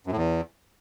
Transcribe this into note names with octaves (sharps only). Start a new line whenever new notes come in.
F#2
A2
E2